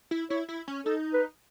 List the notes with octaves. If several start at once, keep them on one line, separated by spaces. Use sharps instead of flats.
E4
E4 C#5
E4
C#4
D#4 A4
B4